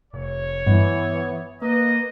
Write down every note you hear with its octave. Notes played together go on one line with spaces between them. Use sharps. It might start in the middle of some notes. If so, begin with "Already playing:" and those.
F1 C#5
G2 E3 B3
A#3 B4 D#5